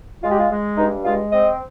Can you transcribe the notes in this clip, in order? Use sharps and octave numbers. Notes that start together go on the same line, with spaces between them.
G#3 F4
G4
F4
G#3
G2 D#4
G#3 F4
C4 D#5